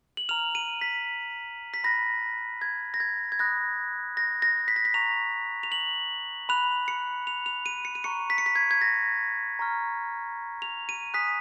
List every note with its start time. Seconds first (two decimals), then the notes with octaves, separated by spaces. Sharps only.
0.17 F#7
0.29 A#5 F6 F7
0.55 D#7
0.81 B6
1.74 B6
1.84 B5 F#6 A#6
2.62 G#6
2.94 A#6
3.00 G#6
3.32 G#6
3.39 B5 D#6 F#6 A#6
4.17 A#6
4.42 A#6
4.68 B6
4.76 A#6
4.85 B6
4.94 A#5 C#6 F#6 F7
5.63 F7
5.72 F#7
6.49 B5 F#6 F7
6.88 C#7
7.27 F7
7.46 F7
7.66 D#7
7.85 C#7
7.95 D#7
8.04 A#5 C#6 F#6 C#7
8.30 B6
8.38 C#7
8.46 B6
8.56 G#6
8.71 G#6
8.82 A#6
9.59 A#5 C#6 F6
10.62 F7
10.89 D#7
11.14 G#5 D#6 F#6 B6